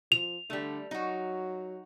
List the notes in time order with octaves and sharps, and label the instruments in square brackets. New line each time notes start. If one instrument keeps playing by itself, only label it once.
[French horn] F3 [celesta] F7
[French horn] D3 [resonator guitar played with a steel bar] G3 A3
[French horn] F#3 [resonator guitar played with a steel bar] D#4 F#4